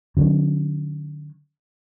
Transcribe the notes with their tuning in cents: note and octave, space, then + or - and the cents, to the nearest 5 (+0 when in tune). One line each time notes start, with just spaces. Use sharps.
D3 +25 F#3 -20 C#4 -15